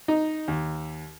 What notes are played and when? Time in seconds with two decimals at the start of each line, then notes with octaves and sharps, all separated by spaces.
0.08 D#4
0.48 D#2